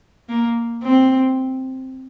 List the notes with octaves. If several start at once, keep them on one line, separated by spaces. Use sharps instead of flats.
A#3
C4